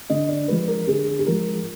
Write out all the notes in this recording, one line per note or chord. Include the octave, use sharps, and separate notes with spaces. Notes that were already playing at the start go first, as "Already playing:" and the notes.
D3 D#5
D5
F3 G#3 B4
A#4
D3 G#4
G#4
F3 G#3 A#4